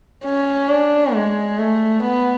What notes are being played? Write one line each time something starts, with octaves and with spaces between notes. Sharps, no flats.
C#4
D4
G#3
A3
B3